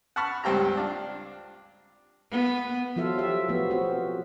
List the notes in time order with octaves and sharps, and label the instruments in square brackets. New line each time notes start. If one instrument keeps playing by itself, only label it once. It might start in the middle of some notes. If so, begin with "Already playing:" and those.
[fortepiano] F#5 A5 B5 C#6 F6
C#2 G2 C4 G4 A#5
D4 F4
[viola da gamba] B3
[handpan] F3 F#3 F4 A4 E5 F5
F4 G4 E5
F3 A3 B3 F#4
A3 C4 F#4